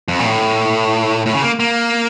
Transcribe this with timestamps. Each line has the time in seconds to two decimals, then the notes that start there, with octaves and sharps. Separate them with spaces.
0.08 F2
0.20 A#2
0.25 A2
1.26 A2
1.34 C#3
1.42 A#3
1.60 A#3